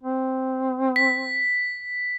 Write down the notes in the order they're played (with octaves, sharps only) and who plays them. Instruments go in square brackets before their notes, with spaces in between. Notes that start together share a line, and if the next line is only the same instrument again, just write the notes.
[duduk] C4
[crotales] B6